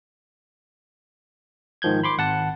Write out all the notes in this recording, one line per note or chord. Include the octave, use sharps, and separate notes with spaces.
G#2 D#3 F3 G6 G#6
B5 C6 D6
G#1 F#5 A5